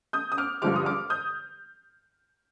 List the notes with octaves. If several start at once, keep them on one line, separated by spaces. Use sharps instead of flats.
D#6 G6
D#6
D6 F6
G2 D3 F3 G#3 D6 F6
D#6
D6 F6
D#6 G6